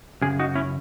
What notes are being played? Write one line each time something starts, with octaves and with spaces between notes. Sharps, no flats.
F#2 C#3 G#4
D#4 F#4
C#4 E4